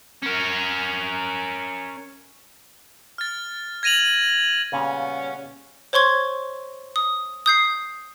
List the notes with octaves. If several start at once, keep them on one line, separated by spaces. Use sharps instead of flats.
C#4 A#4
F6 A6
G#6 A#6 D#7 F7 F#7
A#2 C#3 G3 B3 C#4
C5 C#5 C6 C#6 G#6
D#6
D#6 G6 C7